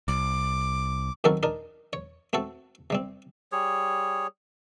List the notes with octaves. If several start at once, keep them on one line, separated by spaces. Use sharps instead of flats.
C2 D6
F#2 D#3 C4 F#4 A4 A#4
D4 D#4 A#4
C#5
A3 C4 F#4 A4
C3 G3 C4
G3 G#4 C#5